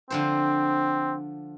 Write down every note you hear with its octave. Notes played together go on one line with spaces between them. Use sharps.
D3 F3 C4 C5